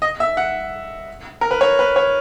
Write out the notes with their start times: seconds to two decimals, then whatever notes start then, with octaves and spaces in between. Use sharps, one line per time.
0.02 D#5
0.20 E5
0.37 F#5
1.41 A#4
1.51 B4
1.61 C#5
1.79 B4
1.96 C#5